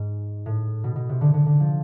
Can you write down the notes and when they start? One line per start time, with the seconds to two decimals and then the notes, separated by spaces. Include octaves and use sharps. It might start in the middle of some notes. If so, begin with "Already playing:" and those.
Already playing: G#2
0.46 A2
0.84 B2
0.96 B2
1.09 C3
1.21 D3
1.34 D3
1.46 D3
1.60 F3